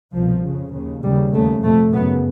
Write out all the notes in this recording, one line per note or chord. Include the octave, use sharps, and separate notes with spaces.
C2 B2 F3
F2 C#3
D#2 C#3
D#2 C#3 G3
D#2 C#3 A3
F2 C3 A3
F#2 C#3 B3